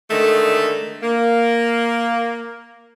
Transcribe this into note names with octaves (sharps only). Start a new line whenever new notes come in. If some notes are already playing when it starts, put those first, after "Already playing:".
D3 D#3 G#3 A3
A#3